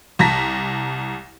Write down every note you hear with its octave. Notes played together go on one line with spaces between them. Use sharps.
C2 A5 A#5 A#6 B6